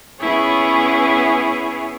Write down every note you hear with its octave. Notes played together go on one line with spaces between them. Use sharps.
B3 C#4 E4 G#4 C#5